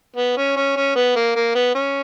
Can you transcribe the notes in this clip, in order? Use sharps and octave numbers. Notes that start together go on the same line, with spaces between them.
B3
C#4
C#4
C#4
B3
A#3
A#3
B3
C#4